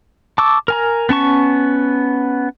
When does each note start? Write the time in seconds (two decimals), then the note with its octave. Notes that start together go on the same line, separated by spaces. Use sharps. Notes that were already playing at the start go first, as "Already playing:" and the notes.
0.38 A5 C#6 D6 E6
0.68 A#4 G#5 A#5
1.09 B3 C#4 A5 C#6